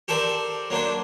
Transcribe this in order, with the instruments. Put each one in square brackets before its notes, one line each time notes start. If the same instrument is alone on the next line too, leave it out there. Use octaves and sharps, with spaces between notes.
[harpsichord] G4 A4 A#4 C5 D5
F#3 A#3 D4 C5